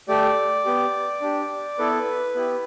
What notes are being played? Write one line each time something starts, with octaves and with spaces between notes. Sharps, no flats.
A3 G4 D5
B3 G4
D4 G4
B3 E4 A4 B4
B3 E4 G4